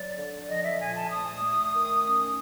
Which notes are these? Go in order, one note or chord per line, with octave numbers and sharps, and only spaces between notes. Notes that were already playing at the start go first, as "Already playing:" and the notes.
Already playing: F#3 D5
D3
F3 D#5
E5
A#2 G#5
A5
A3 D#6
A3
D#3
C#4